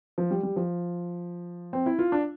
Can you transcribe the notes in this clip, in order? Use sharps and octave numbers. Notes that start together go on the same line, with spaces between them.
F3
G3
G3
F3
C4
E4
F4
D4